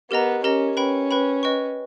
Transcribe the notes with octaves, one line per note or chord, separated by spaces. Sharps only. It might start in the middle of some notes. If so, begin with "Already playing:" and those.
B3 G4 A#4 D#5 A#5
C#4 G4 A#4 D#5 A#5
C#4 B4 G5 B5
B4 G5 B5
B4 D#5 G5 C#6